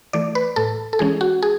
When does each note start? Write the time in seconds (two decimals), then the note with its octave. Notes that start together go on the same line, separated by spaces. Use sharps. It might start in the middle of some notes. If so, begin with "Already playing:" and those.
0.13 E3 A3 D5
0.35 B4
0.56 A2 A4
0.93 A4
0.99 E3 G#3 C#4 G#4
1.21 F#4
1.43 G#4